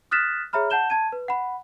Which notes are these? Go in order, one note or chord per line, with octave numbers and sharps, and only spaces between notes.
D#6 F6 F#6 A6 B6 E7
G#4 C#5 E5 A#5 B5 F6
F#5 A5 G6 E7 G7
A5 G#6 D#7
B4
F#5 B5